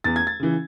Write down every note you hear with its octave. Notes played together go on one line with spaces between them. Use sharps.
E2 A6
G#6
A6
C#3 E3